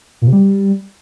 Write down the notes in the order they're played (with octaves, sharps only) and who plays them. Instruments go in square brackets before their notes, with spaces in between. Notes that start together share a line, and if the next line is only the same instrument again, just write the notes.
[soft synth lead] A#2
C3
G3